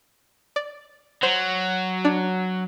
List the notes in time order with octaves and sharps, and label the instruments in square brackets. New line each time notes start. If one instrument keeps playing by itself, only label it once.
[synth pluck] D5
[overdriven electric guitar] F#3 [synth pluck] C5
[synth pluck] D4